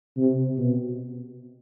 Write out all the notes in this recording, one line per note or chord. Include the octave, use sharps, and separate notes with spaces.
C3
B2